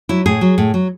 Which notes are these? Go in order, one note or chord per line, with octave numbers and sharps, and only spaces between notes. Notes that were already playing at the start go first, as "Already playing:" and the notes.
F#3 E4
A2 G#4
F#3
A2
F#3